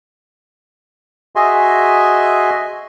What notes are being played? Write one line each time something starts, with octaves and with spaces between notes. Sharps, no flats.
F#4 G#4 D#5 E5 G#5 C6